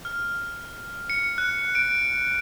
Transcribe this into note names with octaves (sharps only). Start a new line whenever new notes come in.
F6
C#7
F#6
D7